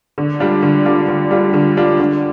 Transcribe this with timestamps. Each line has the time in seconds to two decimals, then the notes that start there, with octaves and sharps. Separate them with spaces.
0.18 D3
0.40 G3 D4 F4
0.63 D3
0.85 G3 D4 F4
1.08 D3
1.31 G3 D4 F4
1.54 D3
1.77 G3 D4 F4
1.99 D3